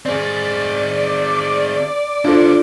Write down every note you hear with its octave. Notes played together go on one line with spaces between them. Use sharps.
C4 G#4 D5
D4 E4 F4 A4 C5